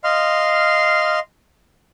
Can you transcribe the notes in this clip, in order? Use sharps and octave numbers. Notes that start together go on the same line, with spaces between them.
D#5 F5 C6 F6